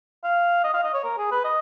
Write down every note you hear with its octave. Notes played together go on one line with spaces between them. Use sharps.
F5
D#5
F5
D#5
C#5
A#4
G#4
B4
D#5